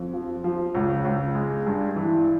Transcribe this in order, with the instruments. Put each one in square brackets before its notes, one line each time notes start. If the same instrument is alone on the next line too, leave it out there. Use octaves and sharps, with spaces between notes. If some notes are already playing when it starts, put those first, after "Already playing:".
Already playing: [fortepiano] F2
F3
F3
C#2
C#2
G#3
G2
E3